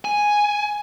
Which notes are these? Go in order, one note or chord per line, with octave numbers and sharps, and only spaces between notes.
G#5